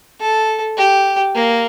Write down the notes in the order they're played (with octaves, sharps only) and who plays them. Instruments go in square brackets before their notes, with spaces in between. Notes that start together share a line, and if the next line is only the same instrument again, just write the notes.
[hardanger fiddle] A4
G4
A#3